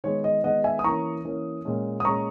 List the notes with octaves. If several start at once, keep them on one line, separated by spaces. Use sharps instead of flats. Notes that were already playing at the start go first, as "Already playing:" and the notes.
D#3 G#3 B3 C#5
D#5
D#3 G#3 B3 D#5 F#5
E5 G#5
D#6
E3 A#3 C#4 A#5 C#6
E3 A#3 C#4
A#2 G#3 C#4
D#6
A#2 G#3 C#4 A#5 C#6